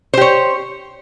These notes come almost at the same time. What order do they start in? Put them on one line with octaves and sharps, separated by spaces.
C5 G4 C#5